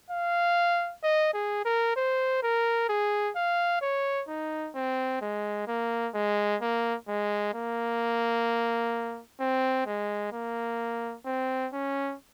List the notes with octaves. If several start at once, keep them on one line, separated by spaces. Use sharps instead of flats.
F5
D#5
G#4
A#4
C5
A#4
G#4
F5
C#5
D#4
C4
G#3
A#3
G#3
A#3
G#3
A#3
C4
G#3
A#3
C4
C#4